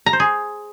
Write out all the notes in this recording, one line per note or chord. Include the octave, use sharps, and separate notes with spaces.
A#5
C5
G#4